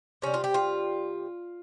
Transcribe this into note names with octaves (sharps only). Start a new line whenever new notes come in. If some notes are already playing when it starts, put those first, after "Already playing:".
C3 G3 C#4
F4
G4
F4